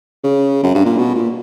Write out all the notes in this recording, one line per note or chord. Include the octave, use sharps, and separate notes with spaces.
C#3
F#2
G2
A#2
B2
A#2